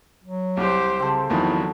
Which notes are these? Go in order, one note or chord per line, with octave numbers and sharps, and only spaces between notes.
F#3
C2 G4 C5
C#3 C4 A4
E2 D#3 F3 F#3 E4